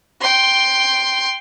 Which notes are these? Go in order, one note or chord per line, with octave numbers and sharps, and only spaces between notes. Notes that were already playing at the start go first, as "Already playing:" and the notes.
G5 C6